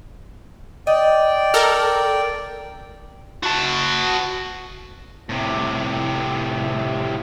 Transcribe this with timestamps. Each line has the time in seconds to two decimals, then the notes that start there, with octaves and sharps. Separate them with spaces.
0.87 D5 D#5 G5
1.54 A4 A#4
3.43 F#4 A5
5.29 A2 C3